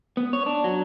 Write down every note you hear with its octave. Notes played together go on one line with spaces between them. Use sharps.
B3
C#5
D4
F#3